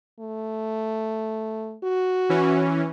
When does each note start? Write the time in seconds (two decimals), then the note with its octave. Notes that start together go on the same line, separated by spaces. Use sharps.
0.20 A3
1.84 F#4
2.29 E3 C#4